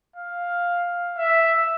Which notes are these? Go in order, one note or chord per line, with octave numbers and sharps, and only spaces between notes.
F5
E5